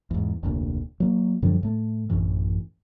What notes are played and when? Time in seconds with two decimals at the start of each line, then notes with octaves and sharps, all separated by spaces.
0.11 E2 G#2
0.43 F1 D2 A#2
1.00 F#3 A#3
1.42 F#2 D3 F3 G3
1.63 A2 A3
2.10 A1 F#2 A2 E3